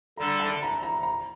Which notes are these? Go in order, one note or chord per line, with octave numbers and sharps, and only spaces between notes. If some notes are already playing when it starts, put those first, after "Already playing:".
D3 G3 D4 A4 A#5
A5
A#5
A#5
A#5